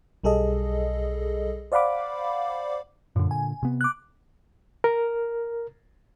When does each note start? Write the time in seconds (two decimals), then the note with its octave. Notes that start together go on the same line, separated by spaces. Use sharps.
0.24 B1 G3 G#4 A4 D#5
1.72 C5 D5 F5 F#5 B5 D6
3.16 F#2 A#2 D3
3.31 G#5
3.63 C3 B3
3.81 D6 F#6
4.84 A#4